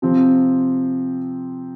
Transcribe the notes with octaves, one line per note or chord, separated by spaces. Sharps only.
C3 F3 C4